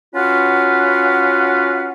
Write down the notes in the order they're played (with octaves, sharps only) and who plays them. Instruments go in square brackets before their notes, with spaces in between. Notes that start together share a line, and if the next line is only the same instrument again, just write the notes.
[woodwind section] C#4 F4 F#4 B4 F5 F#5